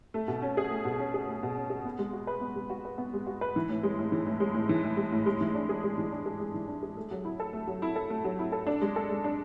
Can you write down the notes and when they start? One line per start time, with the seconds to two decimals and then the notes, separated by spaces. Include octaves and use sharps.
0.14 A3
0.28 B2
0.42 C#4
0.57 G#4
0.71 A3
0.85 B2
0.99 C#4
1.14 G#4
1.28 A3
1.43 B2
1.57 C#4
1.70 G#4
1.85 B3
1.99 G#3
2.13 F#4
2.27 B4
2.41 B3
2.55 G#3
2.70 F#4
2.85 B4
2.98 B3
3.13 G#3
3.27 F#4
3.41 B4
3.56 E3
3.69 A2
3.83 G#3
3.99 A2
4.12 E3
4.26 A2
4.40 G#3
4.54 A2
4.69 E3
4.84 A2
4.97 G#3
5.12 A2
5.26 G#3
5.41 E3
5.54 D4
5.69 G#4
5.83 G#3
5.98 E3
6.11 D4
6.26 G#4
6.40 G#3
6.54 E3
6.68 D4
6.83 G#4
6.97 A3
7.11 F#3
7.25 E4
7.40 A4
7.53 A3
7.67 F#3
7.82 E4
7.96 A4
8.10 A3
8.24 F#3
8.39 E4
8.52 A4
8.67 D4
8.81 G#3
8.96 A4
9.10 G#3
9.24 D4